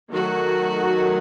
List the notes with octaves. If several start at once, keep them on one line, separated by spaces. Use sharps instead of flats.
D#3 F#3 A3 F#4